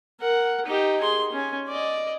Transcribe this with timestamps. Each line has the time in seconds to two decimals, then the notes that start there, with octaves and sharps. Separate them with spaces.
0.20 A#4 F#5
0.66 D#4 G4
1.01 G#4 C6
1.32 C#4 G#5
1.68 D5 D#5